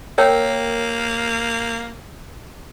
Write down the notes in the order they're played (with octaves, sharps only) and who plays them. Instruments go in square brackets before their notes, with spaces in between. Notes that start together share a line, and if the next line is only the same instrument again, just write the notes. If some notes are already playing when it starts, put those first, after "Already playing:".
[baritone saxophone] A#3 [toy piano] A#4 C#5 G5